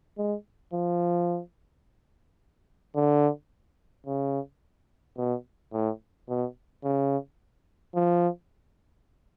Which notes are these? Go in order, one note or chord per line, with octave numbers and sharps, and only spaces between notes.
G#3
F3
D3
C#3
B2
A2
B2
C#3
F3